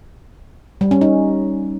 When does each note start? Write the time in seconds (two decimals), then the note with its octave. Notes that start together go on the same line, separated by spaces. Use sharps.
0.81 G3
0.91 C#4
1.01 D#4